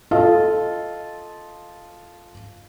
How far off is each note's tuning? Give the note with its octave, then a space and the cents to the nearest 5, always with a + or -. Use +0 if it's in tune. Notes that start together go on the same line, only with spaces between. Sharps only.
F4 +0 A4 -10 D#5 +0